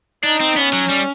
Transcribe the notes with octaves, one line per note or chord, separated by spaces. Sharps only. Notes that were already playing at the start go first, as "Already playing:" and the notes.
D4 D#4
C4
B3 C#4
F#3
G3